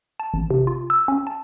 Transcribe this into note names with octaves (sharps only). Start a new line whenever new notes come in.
A5
A1
C3
F4
E6
C#4
A5